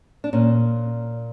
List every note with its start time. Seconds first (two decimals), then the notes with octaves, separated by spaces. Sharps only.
0.24 D4
0.33 A#2 C#4